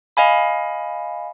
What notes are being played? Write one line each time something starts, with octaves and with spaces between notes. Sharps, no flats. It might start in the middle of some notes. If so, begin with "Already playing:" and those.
D#5 F5 G#5 B5